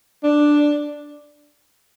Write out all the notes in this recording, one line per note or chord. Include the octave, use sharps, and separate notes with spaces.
D4